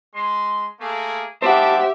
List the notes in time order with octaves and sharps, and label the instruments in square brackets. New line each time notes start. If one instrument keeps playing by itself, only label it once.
[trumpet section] G#3 C6
A3 A#3 G#4
[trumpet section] G3 A5 D6 [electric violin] G4 E5 [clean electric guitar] C5 F#5